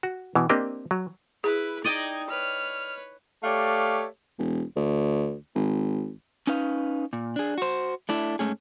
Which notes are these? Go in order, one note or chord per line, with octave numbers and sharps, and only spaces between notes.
F#4
B2 E3
A#3 C4 D4 G4 D#5
F#3
E4 G#4 B4
D#4 D5 D#5 G5 G#6
B4 C#5 F6
A3 G4 C#5 D5 F5
E1
D2
G#1
C#4 D#4 B4 F5
A#2
D4 G#4
F#4 C5
A3 D4 E4
G#2 C#3 A3 C#4 G#4